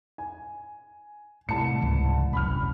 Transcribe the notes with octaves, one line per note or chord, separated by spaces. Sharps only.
G#5
C2 A2 A5 C#7
C#2 G#2 E3
E1 C2 F#2 B5 F6